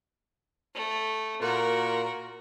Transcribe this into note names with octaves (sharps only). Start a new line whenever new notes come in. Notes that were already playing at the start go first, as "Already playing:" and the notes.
A3
A#2 F#4 A#4